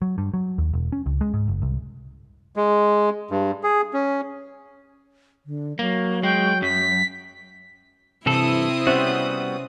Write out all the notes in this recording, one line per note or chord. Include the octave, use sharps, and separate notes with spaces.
F#3
G2
F#3
D#2
E1
C#4
C#2
G#3
G#2
F#1
C2
G#3
G2
G#4
C#4
D3
F#3 A#3
G#3 G5
F#2 B6
G2 C3 E3 C4 E4 A4 D#6
G3 B3 C#4 F#4 C5 E5